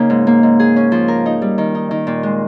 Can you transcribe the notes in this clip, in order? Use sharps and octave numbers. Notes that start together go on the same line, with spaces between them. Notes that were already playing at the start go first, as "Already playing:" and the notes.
Already playing: C#3 A#3 D#4
G#2
A#3
G#2
G#4
C#4
F3
A#4
D#4
G3
D#3
D#4
D#3
A#2
G#3